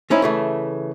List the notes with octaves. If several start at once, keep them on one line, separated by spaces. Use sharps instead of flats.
F3 C#4 D#4 E4
C#3 E3 A3